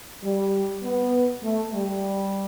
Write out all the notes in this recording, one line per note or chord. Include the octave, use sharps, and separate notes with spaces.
G3
B3
A3
G3